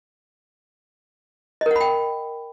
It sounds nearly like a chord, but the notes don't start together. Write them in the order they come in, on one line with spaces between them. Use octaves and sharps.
D#5 A#4 F#5 B5 G5